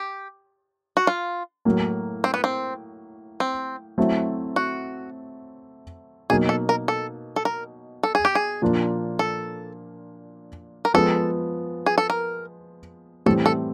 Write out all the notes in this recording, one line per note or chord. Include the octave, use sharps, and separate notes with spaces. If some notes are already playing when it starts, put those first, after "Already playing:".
Already playing: G4
F#4
F4
A2 F#3 A#3
C4
B3
C4
C4
F#3 A3 C4 E4
F#4
B2 F#3 A#3 D#4 G#4
A4
A#4
A4
A4
A#4
A4
G#4
G4
G#4
A#2 F3 A#3 D4 F4
A4
A#4
F3 G#3 B3 A4
G#4
A4
A#4
A2 E3 G3 C4 A4
A4